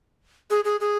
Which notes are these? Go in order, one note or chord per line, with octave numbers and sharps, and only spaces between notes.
G#4
G#4
G#4